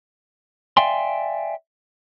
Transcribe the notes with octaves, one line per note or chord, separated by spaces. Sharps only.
D5 E5 F5 G5 G#5 C6